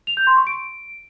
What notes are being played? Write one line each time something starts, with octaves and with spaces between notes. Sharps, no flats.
F7
G6
C6
C#6
D7